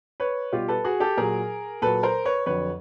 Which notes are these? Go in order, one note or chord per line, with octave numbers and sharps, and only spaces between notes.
B4 C#5
B2 G3 F4 G4
A4 B4
F#4 G#4
G4 A4
A#2 F#3 G#4 A#4
A#2 F#3 A4 B4
A#4 C5
B4 C#5
F2 D3 F#3 B4 C#5